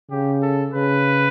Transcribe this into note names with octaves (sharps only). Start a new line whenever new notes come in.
C#3 G4
A4
C#3 B4